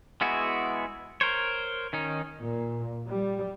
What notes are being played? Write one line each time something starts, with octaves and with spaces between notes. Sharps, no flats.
G#3 B3 E4 F#4 G#4
A#4 C5 C#5
D#3 C#4 D#4
A#2
G3